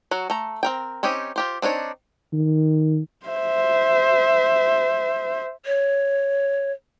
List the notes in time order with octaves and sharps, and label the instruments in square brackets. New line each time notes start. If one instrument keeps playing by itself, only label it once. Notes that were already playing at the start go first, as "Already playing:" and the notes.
[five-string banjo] F#3 F#4
A3 A#5
C4 A#4 G5
C4 C#4 D#4 G4 D#5
F4 G4 C5
C4 D4 D#4 C#5
[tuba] D#3
[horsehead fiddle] C5 E5
[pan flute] C#5